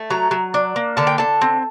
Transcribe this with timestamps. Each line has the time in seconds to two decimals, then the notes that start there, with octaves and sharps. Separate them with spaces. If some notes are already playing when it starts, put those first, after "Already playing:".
Already playing: A3
0.10 F#3 A#5
0.31 F#3
0.54 D4
0.76 A#3
0.97 D3 A5
1.07 G5
1.18 D3 A5
1.41 C4